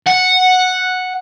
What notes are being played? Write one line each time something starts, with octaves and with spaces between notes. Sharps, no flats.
F#5